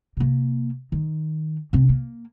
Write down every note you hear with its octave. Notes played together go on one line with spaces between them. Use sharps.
C3 A#3
D#3
C3 C4
A#3